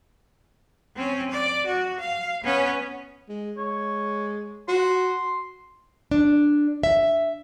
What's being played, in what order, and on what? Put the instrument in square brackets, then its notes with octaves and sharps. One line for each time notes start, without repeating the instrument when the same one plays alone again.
[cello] C4 C#4
D5
F#4
F5
B3 C#4
[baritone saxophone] G#3
[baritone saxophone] G#3 [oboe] C#5
[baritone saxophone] F#4 [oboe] C6
[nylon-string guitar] D4
E5